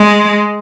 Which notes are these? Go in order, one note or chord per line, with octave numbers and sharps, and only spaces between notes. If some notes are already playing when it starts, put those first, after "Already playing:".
Already playing: G#3